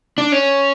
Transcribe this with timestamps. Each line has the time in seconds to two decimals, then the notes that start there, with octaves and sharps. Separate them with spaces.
0.18 D4
0.32 C#4